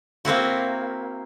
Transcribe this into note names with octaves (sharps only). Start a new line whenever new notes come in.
A#3 C4 E4 F#4